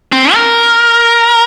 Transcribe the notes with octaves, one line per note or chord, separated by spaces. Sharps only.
C4
A#4